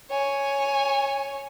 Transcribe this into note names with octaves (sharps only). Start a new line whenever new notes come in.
C#5 G#5